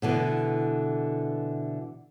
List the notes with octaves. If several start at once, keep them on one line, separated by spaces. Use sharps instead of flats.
B2 D3 E3